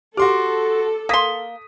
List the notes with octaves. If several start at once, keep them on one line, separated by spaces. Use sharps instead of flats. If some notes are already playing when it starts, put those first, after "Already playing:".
F#4 G4 A4 C6 D6
A#3 C6 D#6 B6